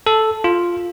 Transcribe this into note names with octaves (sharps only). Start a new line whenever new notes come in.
A4
F4